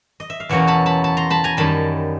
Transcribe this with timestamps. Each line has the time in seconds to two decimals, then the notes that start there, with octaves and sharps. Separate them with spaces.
0.20 D#5
0.30 E5
0.40 F5
0.49 E2 B2 F#3 A#3 C#4 E5 F#5
0.67 A5 B5
0.86 A5 B5
1.04 A5 B5
1.17 A#5 C6
1.30 A5 B5
1.44 G#5 A#5
1.57 F#2 D#3 G3 A5 B5